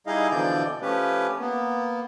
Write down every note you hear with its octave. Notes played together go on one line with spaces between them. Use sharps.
G3 D#4 E4 G#4 D#5 F5
B2 D3 E3 F3 D5 G6
F3 A3 C#4 G4 B4
A#3 B3